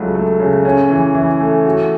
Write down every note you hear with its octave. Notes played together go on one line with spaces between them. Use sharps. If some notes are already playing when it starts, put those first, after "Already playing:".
Already playing: C#2 F#3 A3
A3
C#3
C#4
E3
E3
A3
F#4